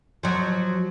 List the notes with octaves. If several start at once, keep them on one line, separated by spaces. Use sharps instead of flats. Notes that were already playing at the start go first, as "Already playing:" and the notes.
F3 F#3